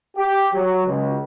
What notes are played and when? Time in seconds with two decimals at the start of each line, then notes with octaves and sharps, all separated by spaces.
0.17 G4
0.53 F#3
0.86 C#2